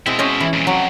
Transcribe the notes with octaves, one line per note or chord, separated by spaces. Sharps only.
B2 G#3 C4 E4
C#4 C5 D#5
E3
F2 A#2
F2 C3 F#3